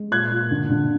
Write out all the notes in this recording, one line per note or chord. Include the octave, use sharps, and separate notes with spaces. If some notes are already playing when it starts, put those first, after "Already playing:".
Already playing: G#3
A#2 F#6 G#6
A#2
D3
D3